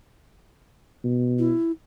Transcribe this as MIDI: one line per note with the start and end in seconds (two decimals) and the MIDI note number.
1.04 1.52 47
1.39 1.72 64